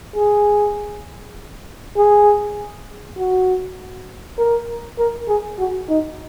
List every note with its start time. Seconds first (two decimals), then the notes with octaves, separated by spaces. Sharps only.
0.16 G#4
1.97 G#4
3.18 F#4
4.38 A#4
4.98 A#4
5.28 G#4
5.59 F#4
5.89 D#4